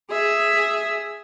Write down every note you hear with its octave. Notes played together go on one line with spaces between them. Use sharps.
G#4 E5